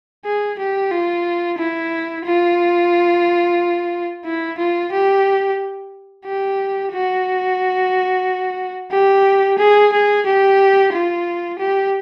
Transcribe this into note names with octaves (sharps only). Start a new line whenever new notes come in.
G#4
G4
F4
E4
F4
E4
F4
G4
G4
F#4
G4
G#4
G#4
G4
F4
G4